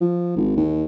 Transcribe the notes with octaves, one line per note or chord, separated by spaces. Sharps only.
F3
G#1
D#2